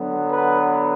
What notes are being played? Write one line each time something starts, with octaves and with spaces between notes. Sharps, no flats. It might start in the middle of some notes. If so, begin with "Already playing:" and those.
Already playing: D3 F#3 B3
B4